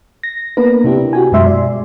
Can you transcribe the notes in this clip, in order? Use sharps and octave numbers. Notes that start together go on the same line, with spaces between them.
A#6
A#3 B3 D4 A#4 B4
C3 D4 E4 G4
F#4 G4 G#5
F#2 B2 G#3 E5 C6
D5